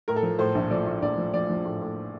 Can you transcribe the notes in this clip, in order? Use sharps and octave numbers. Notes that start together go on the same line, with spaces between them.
A2 A#4
A4
F3 A#4
A2 C5
A#1
F3 D5
A2
A#1 D5
F3
F3 D5
F3
A2
A2